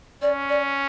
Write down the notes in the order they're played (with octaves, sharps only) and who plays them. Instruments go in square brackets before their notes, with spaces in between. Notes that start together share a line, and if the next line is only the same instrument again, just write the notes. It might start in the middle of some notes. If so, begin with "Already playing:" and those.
[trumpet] C#4 [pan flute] D5
[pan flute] D5